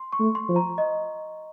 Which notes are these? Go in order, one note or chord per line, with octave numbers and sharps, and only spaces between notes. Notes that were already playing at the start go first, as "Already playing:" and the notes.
Already playing: C6
C#6
A3
C6
F3
A#5
D#5